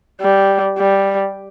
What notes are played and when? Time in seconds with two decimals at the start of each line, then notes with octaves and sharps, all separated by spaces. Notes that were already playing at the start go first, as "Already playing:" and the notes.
0.21 G3
0.78 G3